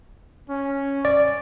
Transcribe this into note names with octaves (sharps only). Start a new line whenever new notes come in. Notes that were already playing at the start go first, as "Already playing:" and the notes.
C#4
D5